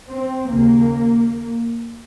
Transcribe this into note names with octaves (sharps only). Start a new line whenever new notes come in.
C4
D#2 C#3 A#3